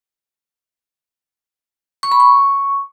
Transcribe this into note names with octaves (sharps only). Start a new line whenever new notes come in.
C#6
B5
C#6